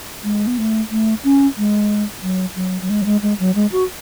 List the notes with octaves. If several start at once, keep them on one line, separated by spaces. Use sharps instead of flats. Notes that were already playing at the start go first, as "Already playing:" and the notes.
G#3
B3
A3
A3
C#4
G#3
F#3
F#3
F#3
G#3
F#3
G#3
G#3
F#3
G#3
F#4